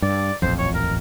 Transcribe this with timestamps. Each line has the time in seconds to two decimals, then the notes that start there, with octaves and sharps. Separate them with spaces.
0.02 G2 D5
0.42 D#1 A1 F2 C5
0.59 C#5
0.75 A#4